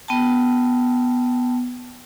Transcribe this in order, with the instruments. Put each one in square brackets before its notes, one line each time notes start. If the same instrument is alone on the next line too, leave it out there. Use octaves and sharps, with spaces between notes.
[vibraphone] B3 G5 A5